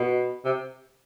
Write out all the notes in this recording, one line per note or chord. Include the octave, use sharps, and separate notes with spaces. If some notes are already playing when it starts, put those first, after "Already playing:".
Already playing: B2
C3